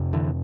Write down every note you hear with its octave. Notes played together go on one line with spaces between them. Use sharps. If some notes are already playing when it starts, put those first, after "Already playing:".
Already playing: F2 C3
D3 E3